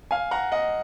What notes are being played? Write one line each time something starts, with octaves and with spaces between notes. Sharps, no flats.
F5 G#5
F#5 A#5
D#5 F#5